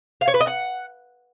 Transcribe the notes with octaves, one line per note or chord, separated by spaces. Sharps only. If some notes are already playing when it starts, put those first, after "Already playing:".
F5
C#5
B4
D#5
F#5